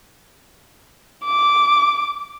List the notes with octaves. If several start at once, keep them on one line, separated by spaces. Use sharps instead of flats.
D6